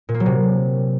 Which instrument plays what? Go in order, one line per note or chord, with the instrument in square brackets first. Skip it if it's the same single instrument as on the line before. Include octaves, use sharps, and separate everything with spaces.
[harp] A#2
A#3
F#3
C3